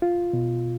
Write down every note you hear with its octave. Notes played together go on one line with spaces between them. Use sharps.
F4
B2